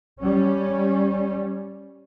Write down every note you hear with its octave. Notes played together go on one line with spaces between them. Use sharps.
G3 C#4